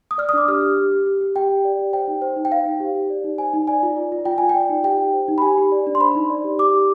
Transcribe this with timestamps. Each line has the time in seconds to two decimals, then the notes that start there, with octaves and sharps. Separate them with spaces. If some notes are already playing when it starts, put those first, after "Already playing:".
0.11 D#6
0.18 D5 F6
0.29 D#6
0.33 D4 D6
0.48 G4 F6
0.62 G4
0.77 G4
0.92 G4
1.07 G4
1.21 G4
1.36 G4 G5
1.49 G4
1.65 D5
1.79 G4
1.93 C5 G5
2.08 D#4
2.22 C5
2.37 D#4
2.45 G5
2.52 C5 F5
2.65 D#4
2.80 G4
2.95 G4
3.10 D5
3.24 D#4
3.38 C5 G#5
3.53 D#4
3.67 D5 G#5
3.83 F4
3.96 D5
4.12 F4
4.25 F4 G5
4.38 F4 G#5
4.49 G5
4.55 D5
4.69 D#4
4.84 G4 G5
4.98 G4
5.13 C5
5.28 D#4
5.38 B5
5.42 G4 G#5
5.57 G4
5.72 D5
5.87 D4
5.95 C6
6.00 C5 B5
6.15 D#4
6.30 D5
6.44 G4
6.59 G4 D6
6.74 G4